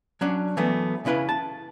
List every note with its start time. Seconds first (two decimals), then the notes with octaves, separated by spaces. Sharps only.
0.21 F#3 C#4 D4
0.57 E3 F#3 A3 B3
1.05 C#3 C#4 E4 B4 F5
1.29 A5